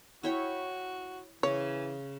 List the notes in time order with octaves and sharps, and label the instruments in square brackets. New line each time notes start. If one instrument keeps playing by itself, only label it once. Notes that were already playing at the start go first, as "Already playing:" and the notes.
[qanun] E4 C#5 G5 [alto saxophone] F#4
[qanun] C#3 [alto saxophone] E3 [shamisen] C#5